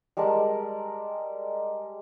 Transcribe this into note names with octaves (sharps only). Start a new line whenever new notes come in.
G3 G#3 A#4 A5